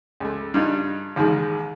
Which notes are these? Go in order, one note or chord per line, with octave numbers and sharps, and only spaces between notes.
C#2 A3
G2 D#4 F4
A1 D#2 D#3 G#3